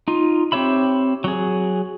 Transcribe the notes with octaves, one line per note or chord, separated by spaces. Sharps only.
D#4 F4
C4 G4 C#5 E5 B5
F#3 G#4